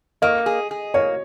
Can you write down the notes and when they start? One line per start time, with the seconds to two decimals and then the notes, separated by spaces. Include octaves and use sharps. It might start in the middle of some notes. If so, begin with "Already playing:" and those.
0.22 A#3 D#5
0.46 G#4
0.71 G#4
0.94 A#3 C#5